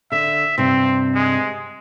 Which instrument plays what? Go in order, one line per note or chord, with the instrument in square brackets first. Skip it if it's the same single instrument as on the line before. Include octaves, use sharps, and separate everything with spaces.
[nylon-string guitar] D3 [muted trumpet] E5
[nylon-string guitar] G2 C3 [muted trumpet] C4
[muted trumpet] G#3